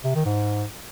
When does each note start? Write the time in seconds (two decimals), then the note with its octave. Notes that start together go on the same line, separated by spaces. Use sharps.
0.04 C3
0.15 D#3
0.25 G#2